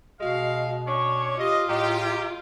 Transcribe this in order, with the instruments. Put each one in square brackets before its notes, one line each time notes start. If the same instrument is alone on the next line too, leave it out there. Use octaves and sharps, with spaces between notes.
[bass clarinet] B2 [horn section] G#3 F5 [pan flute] F#4
[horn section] C#4 D4 C#5 [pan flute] C#6
[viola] F4 [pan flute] G4 [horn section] D#5
[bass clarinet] A2 [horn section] G#3 G4 [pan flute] A#5